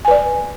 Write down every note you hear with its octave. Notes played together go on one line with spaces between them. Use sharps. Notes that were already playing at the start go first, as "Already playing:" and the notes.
B4 D5 G#5